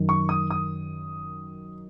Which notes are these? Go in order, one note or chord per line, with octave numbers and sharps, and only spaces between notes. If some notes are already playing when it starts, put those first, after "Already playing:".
Already playing: F#2 D#3
C#6
D#6
D#6